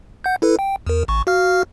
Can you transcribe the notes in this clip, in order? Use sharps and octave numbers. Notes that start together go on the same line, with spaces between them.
F#5 G6
E4 A4 B4
G5
E2 A#4
A1 C#6
F#4 F5 F6